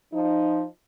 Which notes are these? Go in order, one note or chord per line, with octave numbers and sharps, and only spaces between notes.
F3 D#4